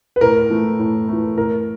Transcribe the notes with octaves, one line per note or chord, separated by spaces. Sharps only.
B4
A2 A#4
E3 A3
A2
E3 A3
A2 A#4